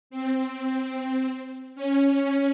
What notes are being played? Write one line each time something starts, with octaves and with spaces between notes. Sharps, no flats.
C4
C#4